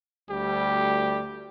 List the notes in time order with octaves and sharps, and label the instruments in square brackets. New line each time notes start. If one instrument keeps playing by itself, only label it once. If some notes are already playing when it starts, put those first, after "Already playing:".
[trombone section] D2 G3 [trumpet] G4